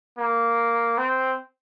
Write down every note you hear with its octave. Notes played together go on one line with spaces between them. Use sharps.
A#3
C4